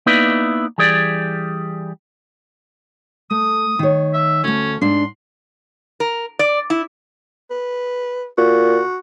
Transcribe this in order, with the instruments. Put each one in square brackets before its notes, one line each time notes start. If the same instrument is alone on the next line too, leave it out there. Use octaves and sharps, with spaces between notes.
[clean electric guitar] A#3 B3 D#4 E4 B4 D5
E3 G3 G#4 D5
[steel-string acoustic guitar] A3 [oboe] D#6
[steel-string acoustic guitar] D#3 C#5
[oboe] E5
[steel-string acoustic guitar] D2 A3 [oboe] C#4
[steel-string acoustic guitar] G#2 D4 [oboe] C6
[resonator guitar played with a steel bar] A#4
D5
E4
[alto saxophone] B4
[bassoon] A#2 [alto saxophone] F#4